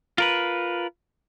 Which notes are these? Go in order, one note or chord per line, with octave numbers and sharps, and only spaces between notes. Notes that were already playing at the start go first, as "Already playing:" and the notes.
F4 A#4 B4